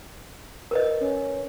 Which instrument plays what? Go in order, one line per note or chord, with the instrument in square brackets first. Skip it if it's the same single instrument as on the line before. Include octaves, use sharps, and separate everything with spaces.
[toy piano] A#4 B4 D#5
[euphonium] C#4